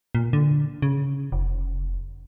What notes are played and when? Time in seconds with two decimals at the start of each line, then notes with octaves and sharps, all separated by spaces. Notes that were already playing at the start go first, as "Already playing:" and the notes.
0.15 A#2
0.33 D3
0.82 C#3
1.32 F1